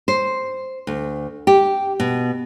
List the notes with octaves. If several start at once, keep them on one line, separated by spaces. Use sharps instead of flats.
C5
D2
G4
B2